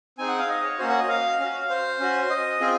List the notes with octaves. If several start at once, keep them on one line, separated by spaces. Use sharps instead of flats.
C4 D#4 G#4 G#5
F#5
F5
D#5
C#5
A#3 C#4 F#4 C5
F#5
D#5
F5
C#4 F#4
C5
C#4 F#4
D#5
C4 F4 G#4